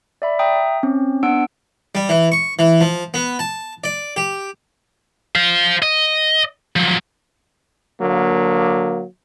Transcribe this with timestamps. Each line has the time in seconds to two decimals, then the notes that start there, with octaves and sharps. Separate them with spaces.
0.22 D5 E5 B5
0.39 E5 G5 A#5 D#6
0.83 C4 C#4
1.23 B3 D4 F#5 E6 D7
1.95 G3
2.09 E3
2.32 C#6
2.59 E3
2.81 F3
3.14 B3
3.39 A5
3.84 D5
4.16 G4
5.35 C5 F5
5.82 D#5
6.76 F3 F#3
8.01 D3 F#3 A#3